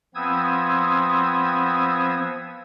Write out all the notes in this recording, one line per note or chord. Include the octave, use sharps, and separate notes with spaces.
F3 B3 C4 D#6 E6 G#6